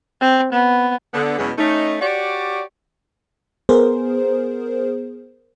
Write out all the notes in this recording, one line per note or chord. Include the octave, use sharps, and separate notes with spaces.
C4
B3
D3 B3
E2 B2 E3 F#3 G#3 C#4
A3 C#4 D#4
F#4 G4 C#5 D5
B3 G#4 A#4 C5